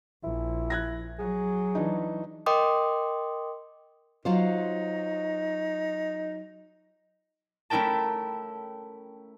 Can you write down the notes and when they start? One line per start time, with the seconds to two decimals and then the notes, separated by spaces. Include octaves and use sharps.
0.24 A#1 E4
0.70 F#6 G#6 A#6
1.19 F#3 G#4
1.75 E3 D4 D#4
2.46 A#4 D#5 G5 C6 D6 D#6
4.25 F#3 D#4 F4 C5
7.70 A3 C#4 E4 A#4 G5 A5